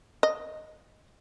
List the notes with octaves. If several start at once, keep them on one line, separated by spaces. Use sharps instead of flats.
D#5